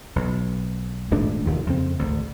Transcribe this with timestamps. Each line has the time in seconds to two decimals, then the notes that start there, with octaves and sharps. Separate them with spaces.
0.16 B1
1.11 D#1 G#2 A3 D4
1.46 F1 D#2 D#3
1.67 F2 C#3 C4
1.99 G#1 D2